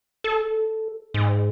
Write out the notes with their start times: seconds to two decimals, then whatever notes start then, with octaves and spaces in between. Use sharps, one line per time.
0.24 A4
1.14 G#2